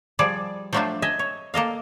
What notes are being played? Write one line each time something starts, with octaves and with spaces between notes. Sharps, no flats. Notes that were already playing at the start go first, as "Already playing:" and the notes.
F3 G3 G#4 D5
F3 F#3 A3 D4 F4 C5
D#5 E5 G#5
C#5
A#3 A4 D#5 F5